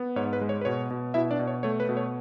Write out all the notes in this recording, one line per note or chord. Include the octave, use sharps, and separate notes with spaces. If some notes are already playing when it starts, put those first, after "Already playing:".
Already playing: B3
G#2 C#5
B4
G#3
C#5
B4
B2 C#5
B2
B2 E4 E5
D4 D5
B2
C#5
A3 C#5
B4
B2
C#5